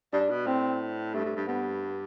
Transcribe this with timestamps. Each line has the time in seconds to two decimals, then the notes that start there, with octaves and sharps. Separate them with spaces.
0.13 G2 D4
0.30 B2
0.46 A2 C4
1.14 G2 A3
1.25 G2
1.36 G2
1.47 G2 B3